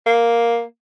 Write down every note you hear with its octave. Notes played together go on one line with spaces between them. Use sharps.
A#3